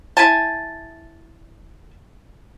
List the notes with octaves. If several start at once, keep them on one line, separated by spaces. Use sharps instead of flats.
E4 G#5 A5